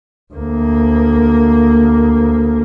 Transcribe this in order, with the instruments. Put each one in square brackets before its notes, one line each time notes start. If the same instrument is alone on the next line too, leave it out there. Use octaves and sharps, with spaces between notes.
[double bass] D2 A#3